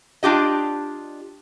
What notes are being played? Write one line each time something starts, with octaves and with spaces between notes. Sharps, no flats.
D4 F4 G4 D#5